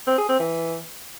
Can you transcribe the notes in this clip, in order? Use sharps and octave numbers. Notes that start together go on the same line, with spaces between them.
C4
G#4
C4
E3